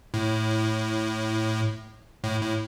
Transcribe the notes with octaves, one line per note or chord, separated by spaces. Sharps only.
A2
A2
A2